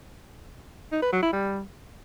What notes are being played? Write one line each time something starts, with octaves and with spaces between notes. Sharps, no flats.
D#4
B4
F#3
E4
G3